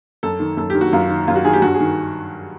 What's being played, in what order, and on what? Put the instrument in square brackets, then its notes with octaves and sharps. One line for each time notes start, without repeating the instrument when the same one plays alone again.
[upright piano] F#2 A4
D#3
F#2 A4
G4
D#3
F#4
F#2 F4
D#3
F#2 F4
F#4
D#3 G#4
G4
G2 F#4
G#4
D#3